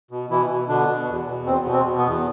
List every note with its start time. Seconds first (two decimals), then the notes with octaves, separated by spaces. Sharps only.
0.11 B2
0.30 B2 E3 E4
0.50 B2
0.68 B2 D3 D4
0.88 B2
1.08 E2
1.28 B2
1.46 E2 C4
1.66 B2
1.73 C4
1.86 B2
1.98 B3
2.06 E2